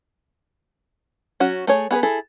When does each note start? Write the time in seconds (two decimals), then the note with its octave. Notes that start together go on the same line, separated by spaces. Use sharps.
1.40 F#3 C#4 F#4
1.67 A3 G#4 C#5
1.91 B3 G#4 A#4 B4
2.03 E4 G#4 A4